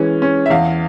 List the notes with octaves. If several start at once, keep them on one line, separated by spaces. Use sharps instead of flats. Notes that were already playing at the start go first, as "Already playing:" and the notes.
Already playing: E3 G#3 C#4
C#4
E5
E2 F5